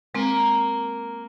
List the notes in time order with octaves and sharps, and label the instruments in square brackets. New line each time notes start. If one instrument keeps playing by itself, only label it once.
[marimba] G#3 C4 [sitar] A#3